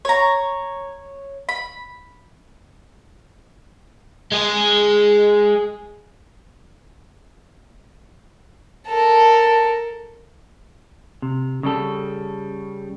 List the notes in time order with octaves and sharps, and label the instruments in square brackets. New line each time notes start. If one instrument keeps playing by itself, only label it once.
[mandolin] C#5 A#5
B5
[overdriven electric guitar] G#3 G#4
[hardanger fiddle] A4 A#4
[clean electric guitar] C3
C#3 G3 A4